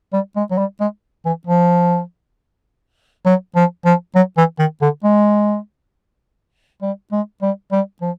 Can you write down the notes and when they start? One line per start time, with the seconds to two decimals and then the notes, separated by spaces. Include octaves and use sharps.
0.13 G3
0.36 G#3
0.51 F#3
0.58 G3
0.81 G#3
1.25 E3
1.47 F3
3.26 F#3
3.56 F3
3.85 F3
4.15 F#3
4.37 E3
4.59 D#3
4.82 D3
5.04 G#3
6.82 G3
7.12 G#3
7.42 G3
7.72 G3
8.02 F3